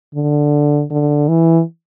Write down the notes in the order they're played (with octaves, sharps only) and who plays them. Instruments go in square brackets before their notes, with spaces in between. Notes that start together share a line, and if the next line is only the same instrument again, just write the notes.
[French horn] D3
D3
E3